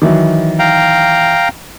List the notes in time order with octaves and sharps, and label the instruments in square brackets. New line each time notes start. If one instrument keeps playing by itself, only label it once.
[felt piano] D#3 E3 F#3
[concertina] F5 G5 A#5